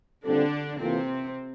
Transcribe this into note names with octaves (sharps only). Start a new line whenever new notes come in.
A#2 D3 G3 C4 D4 F4 A4
C3 E3 A#3 C4 F4 A4